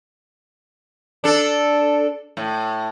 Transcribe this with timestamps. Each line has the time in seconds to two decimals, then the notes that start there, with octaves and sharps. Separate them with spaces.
1.24 D4 A4
2.37 A2